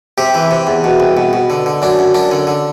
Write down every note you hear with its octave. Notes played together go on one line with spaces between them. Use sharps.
C3 G4
E3
C3
E2
B2
C2
B2
B2
D3
D3
F#2 D4
F#2
F#2 D4
D3
D3